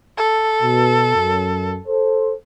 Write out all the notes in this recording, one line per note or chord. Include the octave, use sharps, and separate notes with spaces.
A4
B2
F#2
A4 C5